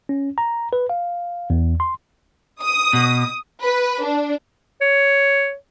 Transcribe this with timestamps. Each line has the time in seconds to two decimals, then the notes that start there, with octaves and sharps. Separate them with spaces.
0.09 C#4
0.38 A#5
0.73 B4
0.89 F5
1.50 E2
1.80 C6
2.62 D#6
2.93 B2
3.63 B4
4.05 D4
4.81 C#5